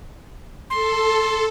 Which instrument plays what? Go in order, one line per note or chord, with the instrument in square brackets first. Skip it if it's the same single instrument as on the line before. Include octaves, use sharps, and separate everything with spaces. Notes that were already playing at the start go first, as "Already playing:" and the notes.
[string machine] A4 [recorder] C6